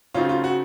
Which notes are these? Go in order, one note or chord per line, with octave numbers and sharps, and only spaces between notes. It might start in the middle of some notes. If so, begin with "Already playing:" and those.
C#3 F#3 A3 C4 D#4 F4
F4
F#4